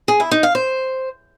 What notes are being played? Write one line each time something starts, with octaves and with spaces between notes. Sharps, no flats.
G#4
E4
D#4
F5
C5